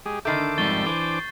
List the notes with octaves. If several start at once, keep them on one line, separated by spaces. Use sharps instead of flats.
G#3 G4 G#4
D3 D#3 A3 A4 D6 G6 C7
F2 G#2 G3 C#6 A6 G7
E3 D4 C5 D6